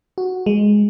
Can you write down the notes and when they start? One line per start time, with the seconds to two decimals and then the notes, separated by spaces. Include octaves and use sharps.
0.18 F#4
0.46 G#3